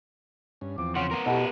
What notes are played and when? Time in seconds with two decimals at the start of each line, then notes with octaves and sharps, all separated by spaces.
0.61 G2 C#4
0.78 E2 F3 C4 D6
0.95 C#3 C#4 F#5 C6
1.11 B3 A#4
1.26 B2 E4 F#4 G4 A4